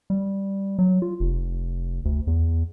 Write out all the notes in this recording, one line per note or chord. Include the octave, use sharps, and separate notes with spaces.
G3
F#3
F4
F1
D2
E2